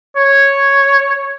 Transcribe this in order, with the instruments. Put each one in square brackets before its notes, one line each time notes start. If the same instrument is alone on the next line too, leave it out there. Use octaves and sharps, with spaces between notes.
[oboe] C#5